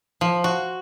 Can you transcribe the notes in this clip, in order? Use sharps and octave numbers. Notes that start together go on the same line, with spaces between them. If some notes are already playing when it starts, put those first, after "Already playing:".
F3
F#4